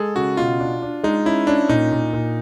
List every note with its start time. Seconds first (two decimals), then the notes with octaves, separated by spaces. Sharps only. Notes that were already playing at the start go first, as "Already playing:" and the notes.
Already playing: G#3 G#4 A4
0.16 C#3 F#4
0.37 B2 F4
0.60 D4
0.82 D4
1.04 G#3 D#4
1.25 C#4 E4
1.47 C#4 D4
1.69 A#2 D#4
1.92 A#2
2.13 A#2